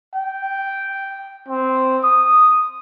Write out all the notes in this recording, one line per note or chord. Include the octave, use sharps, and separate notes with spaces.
G5
C4
D#6